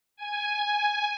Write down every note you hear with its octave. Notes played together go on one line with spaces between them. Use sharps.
G#5